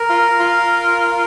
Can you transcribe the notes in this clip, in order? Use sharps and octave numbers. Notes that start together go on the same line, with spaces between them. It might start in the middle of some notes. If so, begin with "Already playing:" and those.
Already playing: A#4
F4
F4